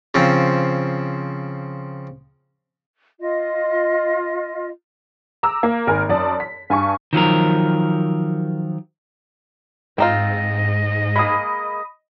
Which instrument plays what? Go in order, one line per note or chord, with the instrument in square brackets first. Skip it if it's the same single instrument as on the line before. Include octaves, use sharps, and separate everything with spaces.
[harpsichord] C#3 F3 C4
[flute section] F4 D#5
[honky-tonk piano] A#5 D6 E6
A#3
G#1 A#4 G#5
F#2 D5 A5 D#6
B6
G2 G#5 A5 C#6
[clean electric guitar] D#3 F3 F#3 A#4
[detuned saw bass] G#2 [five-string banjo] C4 D#4 F4 [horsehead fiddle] D#5
[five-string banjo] G#3 A#3 G#4 [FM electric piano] B5 D#6